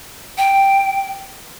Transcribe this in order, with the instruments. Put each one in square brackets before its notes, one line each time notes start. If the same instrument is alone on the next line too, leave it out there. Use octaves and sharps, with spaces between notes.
[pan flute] G5